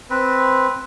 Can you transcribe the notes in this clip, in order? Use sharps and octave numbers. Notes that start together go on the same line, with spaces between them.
C4 B4